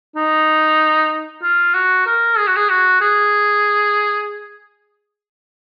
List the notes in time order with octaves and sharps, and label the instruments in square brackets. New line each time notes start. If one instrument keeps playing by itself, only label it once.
[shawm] D#4
F4
F#4
A#4
G#4
F#4
G#4
F#4
G#4